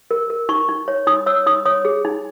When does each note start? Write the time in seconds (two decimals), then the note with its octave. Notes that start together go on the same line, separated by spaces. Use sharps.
0.11 A#4
0.30 A#4
0.49 D#4 C#6
0.69 D#4
0.88 C#5
1.07 D#4 D#6
1.26 C#5 E6
1.46 D#4 D#6
1.65 C#5 D#6
1.85 G#4
2.05 D#4